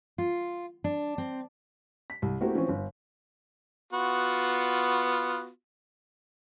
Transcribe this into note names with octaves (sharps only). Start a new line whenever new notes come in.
F4
D4
C4
B6
C2
A3 A#3 C4 E4 F#4 G4
E3 F3 C4 C#4
G1
B3 F4 F#4